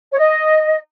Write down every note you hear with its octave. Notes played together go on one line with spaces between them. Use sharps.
C#5
D#5